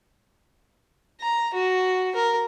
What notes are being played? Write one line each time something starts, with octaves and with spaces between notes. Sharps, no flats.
A#5
F#4
A#4